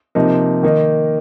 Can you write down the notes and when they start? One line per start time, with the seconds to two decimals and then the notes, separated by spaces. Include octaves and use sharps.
0.15 C3 F3 A#3 D#4
0.63 D#3 A#3 D#4